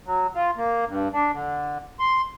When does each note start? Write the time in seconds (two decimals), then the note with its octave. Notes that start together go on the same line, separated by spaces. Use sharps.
0.06 F#3
0.35 F4
0.57 A#3
0.88 G2
1.13 D4
1.33 D3
1.99 C6